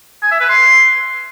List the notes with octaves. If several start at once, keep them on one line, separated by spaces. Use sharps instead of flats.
G#5
E5
B4
C6